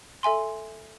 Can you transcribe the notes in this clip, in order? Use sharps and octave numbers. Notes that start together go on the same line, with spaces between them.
A4 E5 G#5 C6